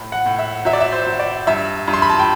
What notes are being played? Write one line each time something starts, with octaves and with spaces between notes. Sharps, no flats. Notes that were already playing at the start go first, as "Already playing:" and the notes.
Already playing: A2
F#5
A2
E5
F#3 E5
D5
E5
C5
F#3
D5
G2 E5
G2
C6
B5
A5
G5